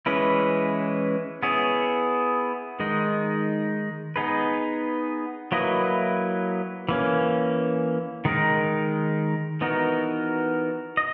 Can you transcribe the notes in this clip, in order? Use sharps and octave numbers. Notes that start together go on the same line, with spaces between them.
E3 G#3 C#4 E4 B4
B3 E4 G#4 C#5
D#3 G#3 D#4
B3 D#4 G#4 B4
F#3 A#3 E4 B4 D#5
E3 A#3 C#4
D#3 G#3 D#4 A#4
E3 B3 D#4 F#4 A#4
D#5